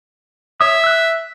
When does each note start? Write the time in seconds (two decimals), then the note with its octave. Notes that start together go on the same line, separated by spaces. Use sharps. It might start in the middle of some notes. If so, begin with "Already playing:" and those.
0.61 C#5 E5 D#6
0.84 E6 F#6